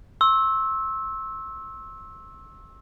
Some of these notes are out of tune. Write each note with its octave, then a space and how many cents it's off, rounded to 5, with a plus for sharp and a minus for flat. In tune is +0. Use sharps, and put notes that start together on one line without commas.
C6 +45 E6 -10